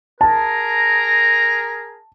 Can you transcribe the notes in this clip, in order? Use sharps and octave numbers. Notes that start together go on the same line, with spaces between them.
G#4 A#4 A5 A#5